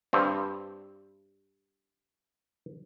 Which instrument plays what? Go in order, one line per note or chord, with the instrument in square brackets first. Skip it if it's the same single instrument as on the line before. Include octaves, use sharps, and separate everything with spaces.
[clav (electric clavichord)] G2 C4